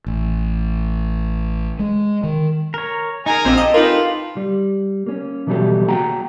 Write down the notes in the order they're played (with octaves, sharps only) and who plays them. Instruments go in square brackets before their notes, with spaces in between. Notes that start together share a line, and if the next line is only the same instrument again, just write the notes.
[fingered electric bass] A1
G#3
D#3
[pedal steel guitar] A#4 C#5
[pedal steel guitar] D#4 A#4 [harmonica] G#4 G#5 A#5
[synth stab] A#1 C4 [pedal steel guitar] F4 G4 C5
[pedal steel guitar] G4 A4 [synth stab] D#5
[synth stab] D#4 A#4 [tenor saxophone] F4 [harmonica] B4
[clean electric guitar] G3
A#3 C#4
B2 E3 F#3 G3 G4 A4
A#3 F#4 G#4 F#5 G5 A#5